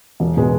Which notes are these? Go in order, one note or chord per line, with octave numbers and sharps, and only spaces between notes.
E1
B2 G#3 B3